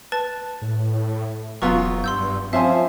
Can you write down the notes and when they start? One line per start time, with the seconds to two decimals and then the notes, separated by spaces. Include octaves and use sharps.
0.12 B4 A5 A6
0.62 A2
1.62 E1 F#2 B3 F4 C#6
2.04 G2 C6 E6 G6
2.53 F3 C4 C#4 E5 F5 G#5 C6